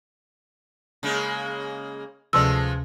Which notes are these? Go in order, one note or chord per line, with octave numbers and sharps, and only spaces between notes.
C#3 G#3 A#3
D2 C3 F3 G#3 A3 E6